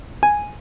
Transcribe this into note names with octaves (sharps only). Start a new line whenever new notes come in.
G#5